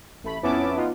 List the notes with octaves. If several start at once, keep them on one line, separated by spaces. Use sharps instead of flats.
A1 A3 B5
F2 B3 C#4 E4 A5 D6
B3 D#4 F4